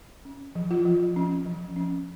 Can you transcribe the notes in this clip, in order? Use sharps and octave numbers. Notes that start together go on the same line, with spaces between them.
C#4
F3
F4
F3
C#4
F3
C#4